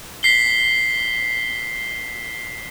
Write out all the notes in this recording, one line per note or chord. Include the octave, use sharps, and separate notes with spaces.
B6 C7 G7